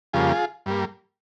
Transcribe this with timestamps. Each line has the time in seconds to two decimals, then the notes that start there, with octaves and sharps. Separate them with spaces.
0.13 F2 C#3 G3 A#3 F4 G#4
0.66 G2 G3 A#3